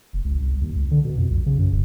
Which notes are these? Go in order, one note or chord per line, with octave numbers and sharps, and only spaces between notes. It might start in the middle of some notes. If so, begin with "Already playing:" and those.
F1
C#2
C2
D#2
C#2
D3
B2
F2
B1
C#3
F#2
D1